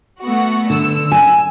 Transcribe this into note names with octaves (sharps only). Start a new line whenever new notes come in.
A3 B3 F#4
D3 E6
G#5